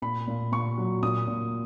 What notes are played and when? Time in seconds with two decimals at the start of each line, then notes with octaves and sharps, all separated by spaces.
0.02 A#2 B5
0.28 A#2
0.52 A#2 C#6
0.78 F#3
1.03 A#2 D#6
1.27 A#2